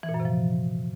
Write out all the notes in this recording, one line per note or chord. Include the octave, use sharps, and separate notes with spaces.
E3
A#2
F#2
C3
F3